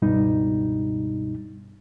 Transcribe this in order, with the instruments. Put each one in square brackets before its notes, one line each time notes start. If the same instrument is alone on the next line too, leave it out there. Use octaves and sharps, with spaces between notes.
[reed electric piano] C#2 G2 B2 G3 D#4